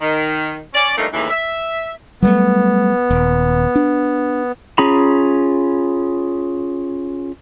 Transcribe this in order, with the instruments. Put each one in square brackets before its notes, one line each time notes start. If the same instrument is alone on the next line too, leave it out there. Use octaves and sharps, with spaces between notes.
[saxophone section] D#3
C#4 D5
G2 A#2 F3 A3 A#3 D#4
D#2 A2 C#3 E3
E5
[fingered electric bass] F#3 G3 A3 [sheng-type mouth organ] B3
[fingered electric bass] D#1
D4
[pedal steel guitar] C#4 F4 G#4 A#5 B5